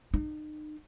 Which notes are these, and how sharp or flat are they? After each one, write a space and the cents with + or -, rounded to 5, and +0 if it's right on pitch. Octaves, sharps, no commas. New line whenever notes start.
D#4 -35